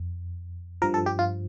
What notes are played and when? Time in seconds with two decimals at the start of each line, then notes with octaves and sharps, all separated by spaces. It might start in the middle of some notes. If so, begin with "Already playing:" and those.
Already playing: F2
0.82 G2 F3 A#4
0.94 A4
1.06 G4
1.19 F4